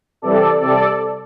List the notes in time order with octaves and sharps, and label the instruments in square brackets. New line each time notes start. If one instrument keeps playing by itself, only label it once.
[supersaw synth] C3 E3 G3 A4 D5
C3 G3 A4 D5